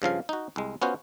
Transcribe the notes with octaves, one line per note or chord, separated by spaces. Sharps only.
G2 C#3 F3 F5
D#4 F#4
C2 G#3
B3 C#4 F4 F#4 C5